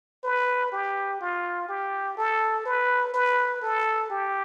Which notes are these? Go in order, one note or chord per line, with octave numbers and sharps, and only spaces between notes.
B4
G4
F4
G4
A4
B4
B4
A4
G4